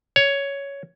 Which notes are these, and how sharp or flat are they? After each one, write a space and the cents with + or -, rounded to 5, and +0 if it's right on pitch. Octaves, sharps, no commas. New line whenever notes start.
C#5 +10